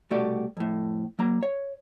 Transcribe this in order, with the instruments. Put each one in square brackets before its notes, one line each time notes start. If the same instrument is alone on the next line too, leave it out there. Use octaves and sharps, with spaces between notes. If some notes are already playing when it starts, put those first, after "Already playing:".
[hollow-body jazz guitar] C2 B2 A3 F#4 G4 D5
F2 A2
F#3 A#3 A#5
C#5